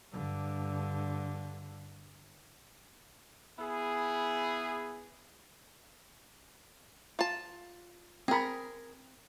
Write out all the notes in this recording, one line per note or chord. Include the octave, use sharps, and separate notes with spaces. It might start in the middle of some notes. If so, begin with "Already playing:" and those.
G2 D3
B3 E4 G#4
F4 A5
C4 G#4 A#4 B5